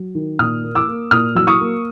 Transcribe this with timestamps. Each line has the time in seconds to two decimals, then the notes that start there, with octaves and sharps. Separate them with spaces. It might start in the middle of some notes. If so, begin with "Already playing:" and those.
Already playing: F#3
0.15 D#3
0.39 A#2 D#6 F6
0.63 A#3
0.75 D6 E6
0.88 A#3
1.11 A#2 D#6 F6
1.35 F#3 E6
1.47 C#6 D#6
1.60 A#3